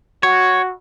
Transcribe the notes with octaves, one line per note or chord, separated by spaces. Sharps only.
F#4 C#5